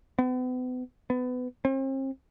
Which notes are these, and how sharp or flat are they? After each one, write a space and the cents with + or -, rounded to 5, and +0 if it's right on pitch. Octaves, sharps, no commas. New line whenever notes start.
B3 +40
B3 +25
C4 +40